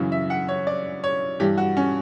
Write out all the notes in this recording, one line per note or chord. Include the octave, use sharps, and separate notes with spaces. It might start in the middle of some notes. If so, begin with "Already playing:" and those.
Already playing: F#2 C#3 E3
E5
F#5
C#5
D5
C#5
G2 E3 G4
F#4
C#4